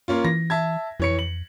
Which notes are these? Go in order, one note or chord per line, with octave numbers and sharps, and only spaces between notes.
A#3 C#4 F4
E3 A#6
E5 A5 G#6
F2 E3 C#5 C#7
F#7